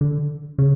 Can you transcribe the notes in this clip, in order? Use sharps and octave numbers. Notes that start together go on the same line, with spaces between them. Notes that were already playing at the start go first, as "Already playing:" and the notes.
D3
C#3